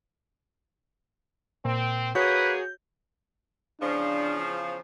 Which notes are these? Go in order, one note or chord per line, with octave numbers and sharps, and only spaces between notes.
A#2 C4
A#3 F#4 G#4 B4 C#5 G6
E2 C#3 F3 D4